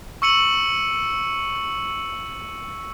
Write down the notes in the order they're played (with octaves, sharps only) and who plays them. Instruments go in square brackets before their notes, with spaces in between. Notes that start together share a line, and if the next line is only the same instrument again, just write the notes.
[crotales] C#6 E6 C#7 D#7 F#7